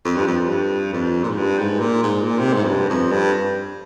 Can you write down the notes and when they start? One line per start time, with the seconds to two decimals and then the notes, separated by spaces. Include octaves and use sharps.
0.05 F2
0.16 G2
0.27 F2
0.49 G2
0.93 F2
1.23 A#2
1.30 G#2
1.37 G2
1.59 G#2
1.80 A#2
2.03 G#2
2.24 A#2
2.39 C3
2.54 G#2
2.64 F2
2.68 G2
2.90 F2
3.12 G2